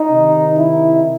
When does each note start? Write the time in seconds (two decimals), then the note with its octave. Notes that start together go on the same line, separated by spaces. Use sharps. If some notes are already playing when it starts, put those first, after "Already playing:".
Already playing: D#4
0.11 C3 D#3
0.58 E4